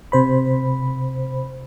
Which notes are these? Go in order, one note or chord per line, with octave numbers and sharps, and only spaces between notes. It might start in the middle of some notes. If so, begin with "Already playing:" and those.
C3 C5 B5